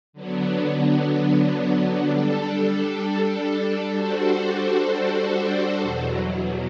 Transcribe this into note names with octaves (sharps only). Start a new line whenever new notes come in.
D3 F#3 B3 D4
G3 D4 A4
G3 D4 F#4 A4 C5
E2 B2 F#3